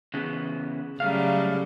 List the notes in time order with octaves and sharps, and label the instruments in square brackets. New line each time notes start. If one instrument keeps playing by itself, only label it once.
[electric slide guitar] C#3 E3 B3
[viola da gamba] C#3 F#3 G3 [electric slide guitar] A3 F5